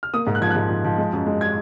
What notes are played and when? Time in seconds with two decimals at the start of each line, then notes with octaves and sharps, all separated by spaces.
0.03 F6
0.14 A#3 D#6
0.27 G#2
0.35 F#6
0.42 F3 G#6
0.50 F#6
0.56 G#2
0.70 F3
0.84 F3
0.98 G#3
1.13 F#2
1.27 G#3
1.41 G#6